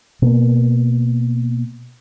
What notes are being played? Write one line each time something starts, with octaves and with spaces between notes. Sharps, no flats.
B2 A#3